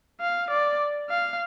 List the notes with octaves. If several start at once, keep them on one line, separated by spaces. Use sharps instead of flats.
F5
D5
F5